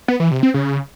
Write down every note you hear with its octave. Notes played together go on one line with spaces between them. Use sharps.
B3
E3
C3
C4
C#3